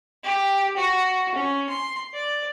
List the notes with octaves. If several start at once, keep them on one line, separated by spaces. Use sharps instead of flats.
G4
F#4
C#4
C6
D5